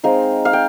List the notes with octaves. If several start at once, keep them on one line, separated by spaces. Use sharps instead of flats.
G#3 C4 D#4 F5
F5
G5